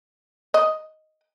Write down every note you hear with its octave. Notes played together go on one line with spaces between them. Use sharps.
D#5